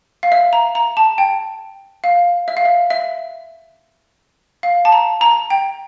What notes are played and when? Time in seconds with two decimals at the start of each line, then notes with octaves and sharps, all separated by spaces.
0.23 F5
0.32 E5
0.53 A#5
0.75 A#5
0.97 A5
1.18 G5
2.04 F5
2.48 E5
2.57 F5
2.65 E5
2.90 E5
4.63 F5
4.85 A5
4.92 A#5
5.21 A#5
5.50 G5